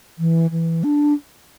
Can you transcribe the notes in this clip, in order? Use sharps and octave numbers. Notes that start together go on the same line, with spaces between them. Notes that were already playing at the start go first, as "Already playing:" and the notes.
E3
E3
D4